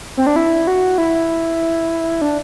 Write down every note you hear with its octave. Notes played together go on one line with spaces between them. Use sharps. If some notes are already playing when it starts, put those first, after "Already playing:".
C4
D4
E4
F#4
E4
D4